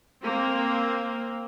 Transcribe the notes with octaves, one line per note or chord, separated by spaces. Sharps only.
A#3 C4